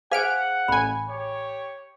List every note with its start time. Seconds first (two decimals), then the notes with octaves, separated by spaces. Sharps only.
0.12 G#4 C5 F5 F#5 G#5 F6 D7
0.68 A1 G#5 B5
1.09 G4 C#5